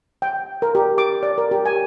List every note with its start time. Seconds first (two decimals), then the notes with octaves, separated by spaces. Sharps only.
0.22 G5
0.62 A#4
0.75 G4
0.98 D6
1.23 D5
1.38 A#4
1.51 G4
1.65 G#5